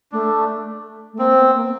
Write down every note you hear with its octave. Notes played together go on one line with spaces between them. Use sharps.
A3 D4
A3
A#3 C4
B3
A#3